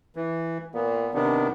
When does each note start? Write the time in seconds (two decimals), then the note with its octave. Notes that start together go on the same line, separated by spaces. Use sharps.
0.16 E3
0.74 A#2 B3
1.14 C3 D#3 B3 D4